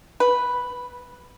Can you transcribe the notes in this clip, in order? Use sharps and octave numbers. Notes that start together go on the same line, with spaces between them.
B4